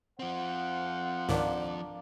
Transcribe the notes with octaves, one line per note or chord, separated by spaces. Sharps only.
F3 C4 C5 F5 F#5
C#2 G#2 D#3 A#3 D4